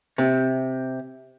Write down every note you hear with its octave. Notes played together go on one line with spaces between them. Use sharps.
C3